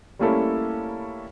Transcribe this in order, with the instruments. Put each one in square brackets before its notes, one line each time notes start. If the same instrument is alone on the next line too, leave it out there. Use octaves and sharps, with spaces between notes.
[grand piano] G3 A3 A#3 C#4 E4 A4